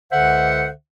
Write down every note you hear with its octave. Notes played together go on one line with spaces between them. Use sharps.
C#2 D3 C5 E5 F#5